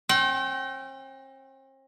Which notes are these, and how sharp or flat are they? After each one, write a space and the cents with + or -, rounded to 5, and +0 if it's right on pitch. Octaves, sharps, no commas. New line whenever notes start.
C4 +45 G5 -30